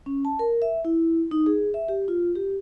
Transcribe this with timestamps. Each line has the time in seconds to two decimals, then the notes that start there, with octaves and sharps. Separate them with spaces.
0.06 C#4
0.25 A5
0.39 A#4
0.62 E5
0.85 E4
1.31 D#4
1.46 G#4
1.74 E5
1.88 G4
2.08 F4
2.35 G4